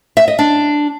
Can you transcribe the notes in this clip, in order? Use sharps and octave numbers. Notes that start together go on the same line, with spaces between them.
E5
D#5
D4